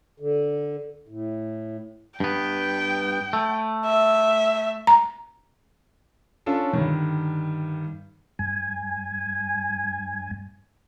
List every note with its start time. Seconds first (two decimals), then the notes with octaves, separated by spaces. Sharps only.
0.20 D3
1.08 A2
2.20 G2 B3 G5
3.33 A3
3.85 E5
4.87 A#5
6.46 C#4 D4 F4 A4
6.73 G2 D3 D#3
8.39 G2 G#5